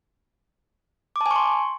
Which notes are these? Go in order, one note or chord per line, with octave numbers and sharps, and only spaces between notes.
D6
A5
G#5
C#6
C6